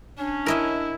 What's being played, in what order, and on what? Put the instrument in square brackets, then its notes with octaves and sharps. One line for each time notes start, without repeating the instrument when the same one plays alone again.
[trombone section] C#4 [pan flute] D4
[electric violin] E4 [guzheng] A#4 D#5 E5